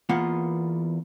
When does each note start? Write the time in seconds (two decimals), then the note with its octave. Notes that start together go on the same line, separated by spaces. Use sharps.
0.09 E2 A#3 B3 F4 F#5